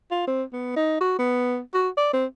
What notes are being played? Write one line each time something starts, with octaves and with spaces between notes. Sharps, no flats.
F4
C4
B3
D#4
F#4
B3
F#4
D5
C4